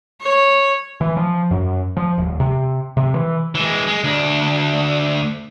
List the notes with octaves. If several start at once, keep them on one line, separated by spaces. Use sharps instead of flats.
C#5
E3
F3
F#2
F3
D#1
C3
C3
E3
E3 G#3
G#3
D2 D4